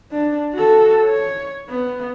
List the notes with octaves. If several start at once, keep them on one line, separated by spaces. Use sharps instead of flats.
D4
F#4 A4
C#5
B3